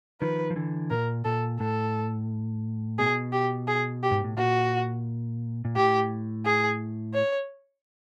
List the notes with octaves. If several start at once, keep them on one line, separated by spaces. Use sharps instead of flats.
D#3 F3 B4
F3
D3 E3
A#2 A#4
A#2 A4
A2 A4
B2 G#4
G4
G#4
G4
G#2
A2
A#2 F#4
A#2
A2 G4
G#4
C#5